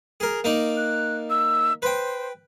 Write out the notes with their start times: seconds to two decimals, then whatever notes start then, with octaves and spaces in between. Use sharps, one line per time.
0.20 G#4 A#4
0.44 A#3 D#4 D5
0.77 F#6
1.30 E6
1.82 B4 C5 G5